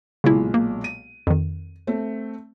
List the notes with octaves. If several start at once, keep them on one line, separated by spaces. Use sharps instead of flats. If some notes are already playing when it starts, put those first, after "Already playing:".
B1 A#2 C#3 G#3 E4
A#3
D#7
F2 D#3
A3 C4